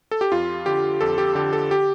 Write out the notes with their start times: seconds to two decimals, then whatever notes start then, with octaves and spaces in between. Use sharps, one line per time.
0.11 A4
0.21 G4
0.32 F2 F4
0.66 D3 G4
1.01 F2 A4
1.18 G4
1.35 D3 G4
1.53 A4
1.71 G4